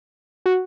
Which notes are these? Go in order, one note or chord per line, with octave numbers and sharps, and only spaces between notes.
F#4